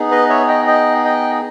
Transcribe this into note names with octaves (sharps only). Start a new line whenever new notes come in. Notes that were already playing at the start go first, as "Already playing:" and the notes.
Already playing: B3 D#4 G#4
B4 D#5
C#5 E5
D#5 G5
D#5 G5
D#5 G5